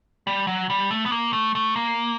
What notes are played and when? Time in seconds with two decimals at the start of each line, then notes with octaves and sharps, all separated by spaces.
0.27 G3
0.47 F#3
0.70 G3
0.91 A3
1.06 B3
1.12 A#3
1.33 A3
1.55 A3
1.76 A#3